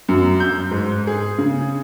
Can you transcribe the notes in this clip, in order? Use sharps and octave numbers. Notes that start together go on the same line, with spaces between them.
F#2
G6
G#2
G#4
C#3